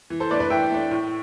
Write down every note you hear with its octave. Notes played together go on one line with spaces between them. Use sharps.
E3
A4 C5
A3 D4 B4 D5
B4 D5
E3 E5 G5
A3 D4
A2